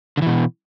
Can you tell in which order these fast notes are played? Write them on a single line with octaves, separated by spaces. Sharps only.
D3 E3 B2